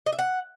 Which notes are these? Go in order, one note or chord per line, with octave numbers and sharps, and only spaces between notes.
D#5
E5
F#5